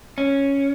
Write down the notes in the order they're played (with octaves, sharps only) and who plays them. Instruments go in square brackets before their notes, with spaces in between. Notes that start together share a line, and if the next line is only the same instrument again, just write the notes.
[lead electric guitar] C#4